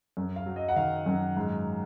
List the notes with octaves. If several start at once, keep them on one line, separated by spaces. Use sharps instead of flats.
F#2
F5
F#3
D#5
F#5
D#3 F5
F#2
G#2